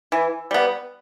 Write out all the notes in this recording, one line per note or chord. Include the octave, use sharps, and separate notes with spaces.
E3
G3 B3